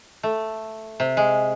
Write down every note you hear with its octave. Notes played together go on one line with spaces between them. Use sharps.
A3
C3
G#3